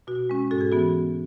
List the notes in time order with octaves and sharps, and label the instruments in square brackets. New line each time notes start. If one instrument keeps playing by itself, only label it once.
[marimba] B2 F#4
G#3 C#4
G#2 F#4 A4
G#4
E3 B3 F#4